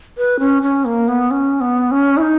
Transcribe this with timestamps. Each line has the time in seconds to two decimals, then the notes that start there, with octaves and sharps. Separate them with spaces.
0.18 B4
0.39 C#4
0.62 C#4
0.85 A#3
1.08 B3
1.31 C#4
1.61 B3
1.91 C#4
2.17 E4
2.22 D#4